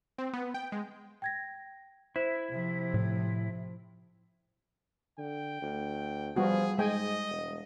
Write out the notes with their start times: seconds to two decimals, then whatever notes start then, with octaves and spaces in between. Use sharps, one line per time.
0.18 C4
0.33 B3
0.54 G5
0.72 G#3
1.22 G5 G#6 A#6
2.16 E4 C5 E7
2.50 C3 F3
2.94 A2
5.19 D3 G5
5.62 D2
6.36 F3 G3 B3 F#4 G#4
6.78 G#2 G#3 D#5 G5 G#5
7.30 E1